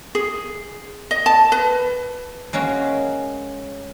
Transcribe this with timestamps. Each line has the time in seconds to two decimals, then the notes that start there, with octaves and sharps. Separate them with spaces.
0.15 G#4
1.11 D#5
1.26 A5
1.52 B4
2.53 G#3 A#3 C#4 F#4